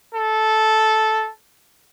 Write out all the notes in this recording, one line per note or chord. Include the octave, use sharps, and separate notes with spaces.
A4